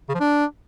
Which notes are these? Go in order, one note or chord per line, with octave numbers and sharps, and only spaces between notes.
C#3
F3
D4